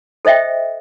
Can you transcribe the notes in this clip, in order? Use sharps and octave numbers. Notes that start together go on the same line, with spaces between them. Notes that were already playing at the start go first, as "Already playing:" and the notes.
A4 C5 D#5 E5 G5